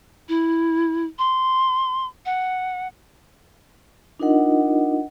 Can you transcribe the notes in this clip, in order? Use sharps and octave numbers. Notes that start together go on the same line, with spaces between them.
E4
C6
F#5
D4 D#4 F4 A#4 D#5 F#5